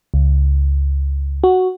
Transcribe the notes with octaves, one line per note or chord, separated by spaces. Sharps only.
C#2
F#4